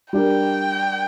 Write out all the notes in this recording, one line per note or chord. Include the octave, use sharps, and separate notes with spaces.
G3 D4 A#4 G5